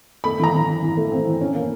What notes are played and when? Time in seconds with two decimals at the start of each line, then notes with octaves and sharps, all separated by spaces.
0.24 A3 B5
0.40 E3 A#5
0.54 E3
0.68 E3
0.82 E3
0.97 A3
1.12 C4
1.26 E3
1.41 C#4
1.55 A#3